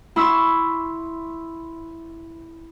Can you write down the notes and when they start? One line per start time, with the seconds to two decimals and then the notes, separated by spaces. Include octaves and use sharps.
0.16 E4 C6 C#6 E6